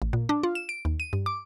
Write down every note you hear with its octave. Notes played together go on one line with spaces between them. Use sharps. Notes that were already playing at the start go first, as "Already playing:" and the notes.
A1
A#2
D4
F4
E7
D7
D#2
D#7
G2
D6